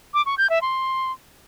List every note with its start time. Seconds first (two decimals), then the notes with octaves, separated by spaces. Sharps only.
0.14 D6
0.26 C#6
0.38 G6
0.50 E5
0.62 C6